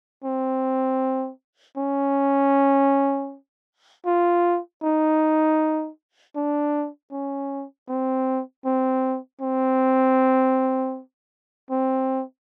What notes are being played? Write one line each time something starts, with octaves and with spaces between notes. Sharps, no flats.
C4
C#4
F4
D#4
D4
C#4
C4
C4
C4
C4